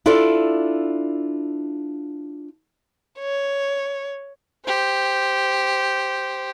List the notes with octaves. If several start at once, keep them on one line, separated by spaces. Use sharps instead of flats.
D4 E4 F4 A4 D5
C#5
G4 C5